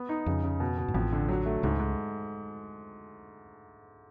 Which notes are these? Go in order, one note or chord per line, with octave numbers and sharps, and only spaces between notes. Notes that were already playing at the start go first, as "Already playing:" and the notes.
Already playing: B3
D#4
F2 C#3
C#3
B2
B2
G#2
A1 F2 A2
D3
F#3
A3
C#2 G#2 C#3
G#2